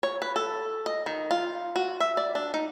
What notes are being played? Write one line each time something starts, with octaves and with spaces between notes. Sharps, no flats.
C#5
B4
A4
D#5
D#3
F4
F#4
E5
D5
D4
D#4